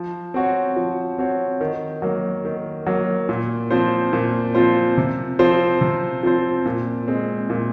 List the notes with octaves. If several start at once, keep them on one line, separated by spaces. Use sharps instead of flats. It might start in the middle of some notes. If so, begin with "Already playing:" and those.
Already playing: F3
C4 F#4 C#5
F3
C4 F#4 C#5
D#3
F#3 A#3
D#3
F#3 A#3
A#2
F3 C4 F4 C5
A#2
F3 C4 F4 C5
C3
F3 C4 F4 C5
C3
F3 C4 F4 C5
A#2
G#3 C4
A#2